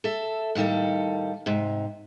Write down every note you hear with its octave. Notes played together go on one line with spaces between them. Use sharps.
A4 E5
A2 D#3 G3 A#3 A4
G#2 C3